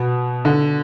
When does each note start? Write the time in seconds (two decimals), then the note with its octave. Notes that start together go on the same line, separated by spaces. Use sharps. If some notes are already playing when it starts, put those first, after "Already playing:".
Already playing: B2 B3
0.45 D3